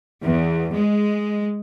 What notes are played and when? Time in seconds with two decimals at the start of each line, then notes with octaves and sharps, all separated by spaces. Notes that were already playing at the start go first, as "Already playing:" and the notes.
0.24 E2
0.74 G#3